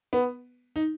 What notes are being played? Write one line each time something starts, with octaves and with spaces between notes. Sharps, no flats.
B3
D#4